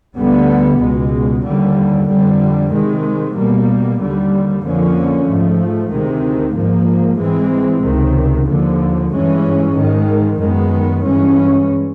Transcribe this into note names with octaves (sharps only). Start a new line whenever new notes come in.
D2 D3 G3 B3
C#2 B2 G#3
D#2 D3 G3
F2 D3 G3
C3 D#3 G#3
B2 G3 A#3
D#2 D3 G3
F2 D3 F3 A#3 C#4
G#2 F3 A3
D2 C3 D#3 G#3
G#2 F3 A#3
G#2 E3 G#3 C4
C#2 C3 D#3
D#2 D3 F3
G2 E3 G#3 C#4
G#2 D#3 G#3
F#2 D#3 G#3 B3
G2 E3 G#3 C#4